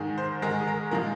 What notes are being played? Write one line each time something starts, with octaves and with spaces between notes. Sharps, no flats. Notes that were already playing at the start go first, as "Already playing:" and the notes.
Already playing: G#2 D#3 G#3
C5
G#2 D#3 G#3 A#4
G#4
A#4
A#2 F3 G#3 A#4